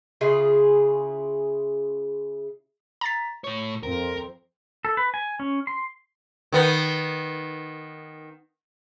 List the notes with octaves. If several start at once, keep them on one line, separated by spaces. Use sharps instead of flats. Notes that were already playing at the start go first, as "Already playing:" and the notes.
C#3 E4 F4 G#4
A#5 A6 B6
A2 C#5
F2 C4 A#4
A4
B4
G#5
C#4
C6
D#3 B3